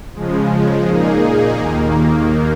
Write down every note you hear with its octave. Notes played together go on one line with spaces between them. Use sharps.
C#3 F3 G#3
A#2 A#3 D#4 G#4
D#2 D#3 A#3